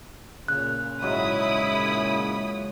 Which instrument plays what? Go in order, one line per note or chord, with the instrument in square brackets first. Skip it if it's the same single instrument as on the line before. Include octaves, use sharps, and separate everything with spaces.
[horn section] A#2 C#3 [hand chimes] F#6
[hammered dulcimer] G#2 F#3 D#5 [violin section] E4 B5 D#6